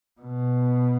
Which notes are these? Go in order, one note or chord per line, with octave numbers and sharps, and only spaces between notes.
B2